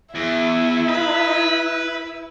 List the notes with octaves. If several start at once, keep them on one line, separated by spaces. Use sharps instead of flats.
E2 E4
B4